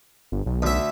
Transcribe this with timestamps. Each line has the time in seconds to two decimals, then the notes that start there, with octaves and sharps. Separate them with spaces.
0.32 G1
0.46 B1
0.62 D2 E5